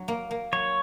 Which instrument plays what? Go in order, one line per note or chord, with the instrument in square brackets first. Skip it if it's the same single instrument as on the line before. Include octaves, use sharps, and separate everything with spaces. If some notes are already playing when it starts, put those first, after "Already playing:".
Already playing: [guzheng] F#3
A#3
A#3
[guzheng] F#3 [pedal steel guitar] C#5